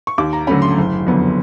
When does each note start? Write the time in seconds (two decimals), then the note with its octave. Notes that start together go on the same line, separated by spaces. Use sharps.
0.07 C#6
0.18 D#2 D6
0.33 A#5
0.47 D3 F#3 A3 C#4 B5
0.62 C6
0.77 F#1
1.07 F2 D3 F#3 B3